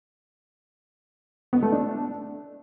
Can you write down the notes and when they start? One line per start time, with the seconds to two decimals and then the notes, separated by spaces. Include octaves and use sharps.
1.53 B3
1.63 A3
1.72 D4